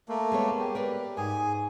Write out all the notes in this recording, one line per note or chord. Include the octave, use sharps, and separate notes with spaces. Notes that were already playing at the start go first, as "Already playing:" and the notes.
A3 A#3
G#3 B3 C#5
G4
A#4 B4 D5
G#2 G#4 G#5